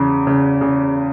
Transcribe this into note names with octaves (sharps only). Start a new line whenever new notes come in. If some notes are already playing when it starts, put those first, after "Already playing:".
Already playing: E2 C#3
C#3
C#3